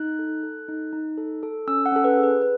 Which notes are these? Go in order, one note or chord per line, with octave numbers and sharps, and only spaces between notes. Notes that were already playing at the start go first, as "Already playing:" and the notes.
Already playing: D#4 F#6
A4
A4
D#4
D#4
A4
A4
C#4 E6
F#5
C#4 A4
B4
G#4
B4
G#4 B4